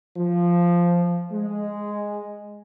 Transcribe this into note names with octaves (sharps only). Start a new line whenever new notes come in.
F3
G#3